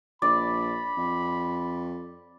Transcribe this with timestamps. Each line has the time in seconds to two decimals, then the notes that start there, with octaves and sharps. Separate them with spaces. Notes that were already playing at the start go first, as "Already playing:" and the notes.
0.22 A#1 D5 B5
0.97 F2